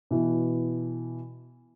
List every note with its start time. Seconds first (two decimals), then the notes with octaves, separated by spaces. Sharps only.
0.11 B2 E3